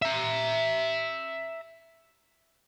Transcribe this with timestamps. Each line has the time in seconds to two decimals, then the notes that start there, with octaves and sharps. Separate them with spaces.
0.02 E5 A#5